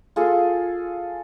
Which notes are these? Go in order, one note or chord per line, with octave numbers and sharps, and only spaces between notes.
F4 G#4 A4